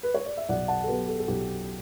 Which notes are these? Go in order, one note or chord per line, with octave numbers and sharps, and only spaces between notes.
B4
C#5
D5
E5
B1 D5 F#5
F#5 A5
A4
B2 F#3 B3 G4 B4
A4
A4
B1 G4